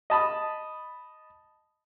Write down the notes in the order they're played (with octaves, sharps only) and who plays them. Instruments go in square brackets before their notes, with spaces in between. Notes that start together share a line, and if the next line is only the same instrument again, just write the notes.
[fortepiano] D#5 A5 B5 D#6